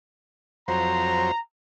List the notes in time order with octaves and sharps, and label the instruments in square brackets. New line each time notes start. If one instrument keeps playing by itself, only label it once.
[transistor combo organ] F2 F#3 C5 [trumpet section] A#5